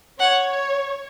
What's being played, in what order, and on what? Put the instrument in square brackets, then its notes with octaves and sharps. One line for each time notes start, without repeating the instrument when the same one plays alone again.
[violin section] C#5 [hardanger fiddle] F#5